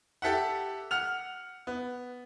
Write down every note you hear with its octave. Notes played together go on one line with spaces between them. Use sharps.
G4 A4 E5 F#5
F#5 F6 F7
B3